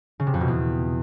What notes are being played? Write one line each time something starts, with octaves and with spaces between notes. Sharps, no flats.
C#3
C3
F2
B2
E2